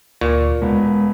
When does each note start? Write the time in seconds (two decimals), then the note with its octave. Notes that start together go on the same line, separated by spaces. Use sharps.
0.21 D2 A#2 C#6
0.62 E1 G#3 B3